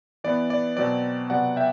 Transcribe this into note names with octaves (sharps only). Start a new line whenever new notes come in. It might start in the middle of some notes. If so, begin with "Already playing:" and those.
E3 B3 D5
D5
B2 F#3 C4 D5
C3 F#3 B3 D5 F#5
E5 G5